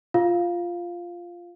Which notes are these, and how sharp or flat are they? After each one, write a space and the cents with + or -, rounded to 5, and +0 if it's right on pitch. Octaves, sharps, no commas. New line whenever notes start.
F4 -5 F5 +0